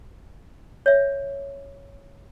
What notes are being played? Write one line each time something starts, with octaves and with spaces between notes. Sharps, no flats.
C#5 E5